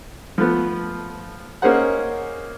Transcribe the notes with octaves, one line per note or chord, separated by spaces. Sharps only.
F3 A3 B3
A#3 C#4 D#4 G#4 C5 F#5